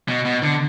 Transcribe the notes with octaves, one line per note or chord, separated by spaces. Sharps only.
B2
B2
D3